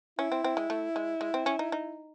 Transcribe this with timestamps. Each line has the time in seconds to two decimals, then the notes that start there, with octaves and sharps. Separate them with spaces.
0.19 C#4 E4
0.32 C4
0.44 C4
0.57 G#3
0.70 A3
0.96 G#3
1.21 G#3
1.34 C4
1.46 C#4
1.59 D#4
1.72 D#4